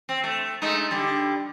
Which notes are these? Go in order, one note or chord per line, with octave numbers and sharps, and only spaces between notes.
C4
A3
G#3 A3 D#4
D3 G3